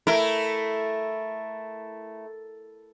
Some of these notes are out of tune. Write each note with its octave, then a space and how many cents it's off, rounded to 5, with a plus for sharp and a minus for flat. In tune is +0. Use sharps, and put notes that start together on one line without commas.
A3 +0 E4 +0 A#4 +0